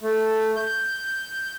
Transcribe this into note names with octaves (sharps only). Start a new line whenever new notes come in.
A3
G6